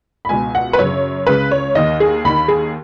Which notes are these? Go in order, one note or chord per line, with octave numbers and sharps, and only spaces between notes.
B5
C#2 B2 G#5
F#5
B4
F#2 C#3 C#5
C#2 C#3 B4
C#5
D#2 D#3 D#5
G#4
D#2 D#3 B5
G#4